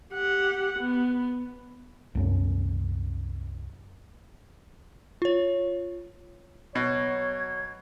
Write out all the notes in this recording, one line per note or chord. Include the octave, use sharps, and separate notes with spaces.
G4 F#5
B3
C2 F#2 C#4
F4 C#5
B2 F#3 C#5 G#6